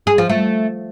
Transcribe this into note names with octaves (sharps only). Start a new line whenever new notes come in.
G#4
F3
A3